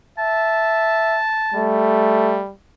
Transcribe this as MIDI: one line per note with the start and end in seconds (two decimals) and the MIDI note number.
0.18 1.19 76
0.18 1.75 81
1.54 2.53 55
1.54 2.42 57